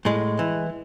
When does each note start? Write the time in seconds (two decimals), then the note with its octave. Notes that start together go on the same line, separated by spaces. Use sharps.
0.05 A2 G#3
0.39 E3